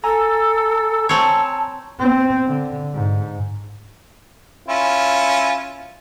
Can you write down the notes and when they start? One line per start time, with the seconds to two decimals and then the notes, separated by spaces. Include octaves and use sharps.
0.04 A4 G#5 A#5 E6
1.09 C4 C#5 A5
2.00 C4
2.46 D3
2.94 G#2
4.68 C#4 E4 F4